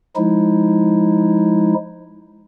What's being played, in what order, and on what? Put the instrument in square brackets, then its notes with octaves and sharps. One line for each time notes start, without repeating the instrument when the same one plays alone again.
[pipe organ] F3 G#3 D#4 E4